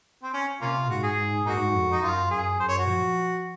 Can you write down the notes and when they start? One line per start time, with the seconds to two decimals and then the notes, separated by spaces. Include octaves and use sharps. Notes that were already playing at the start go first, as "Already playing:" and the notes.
0.23 C4
0.34 C#4
0.61 C3 A#3 C#4 F4
0.89 G#2 F#4
1.03 G#4
1.17 G#2
1.46 G#2 A#3 D#4 F#4
1.74 F2
1.92 D#4
2.02 F#2 F4
2.31 F#2 G#4
2.59 F#2 C5
2.68 C#5
2.78 F#4
2.88 F3